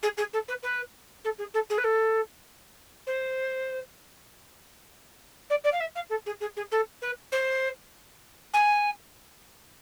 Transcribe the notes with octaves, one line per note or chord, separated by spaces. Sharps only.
G#4
G#4
A4
B4
B4
A4
G#4
A4
G#4
B4
A4
C5
D5
D5
F5
E5
F5
A4
G#4
G#4
G#4
A4
B4
C5
G#5